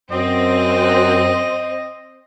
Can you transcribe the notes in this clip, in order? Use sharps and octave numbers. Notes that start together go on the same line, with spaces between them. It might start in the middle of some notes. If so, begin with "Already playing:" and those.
F#2 C4 D#5